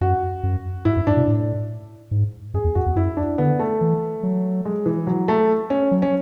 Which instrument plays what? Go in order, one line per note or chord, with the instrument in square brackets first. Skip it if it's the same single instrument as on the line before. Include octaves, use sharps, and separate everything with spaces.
[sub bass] F#2 [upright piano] F#4
[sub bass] F#2
[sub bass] G#2 [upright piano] E4
[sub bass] F#2
[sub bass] G#2 [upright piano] D4
[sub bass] B2
A2
G#2
[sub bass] F#2 [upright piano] G#4
[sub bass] E2
[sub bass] F#2 [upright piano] F#4
[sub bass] E2
[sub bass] F#2 [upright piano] E4
[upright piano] D4
[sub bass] D3 [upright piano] B3
[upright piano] A3
[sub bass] E3
F#3
[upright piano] G#3
E3
F#3
A3
C#4
[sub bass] F#3
[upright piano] C#4